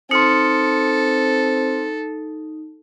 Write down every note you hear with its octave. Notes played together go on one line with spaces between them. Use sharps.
C4 D#4 A4 C6 F6 C#7